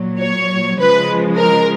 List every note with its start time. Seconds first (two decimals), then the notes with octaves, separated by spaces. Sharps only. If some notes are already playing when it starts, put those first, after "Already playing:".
Already playing: A#2 F#3
0.20 C#5
0.79 C#3 F3 G#3 B4
1.37 A#4